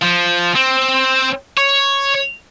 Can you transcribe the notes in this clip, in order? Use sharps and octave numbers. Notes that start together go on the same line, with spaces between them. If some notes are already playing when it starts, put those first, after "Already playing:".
F3
C4
C#5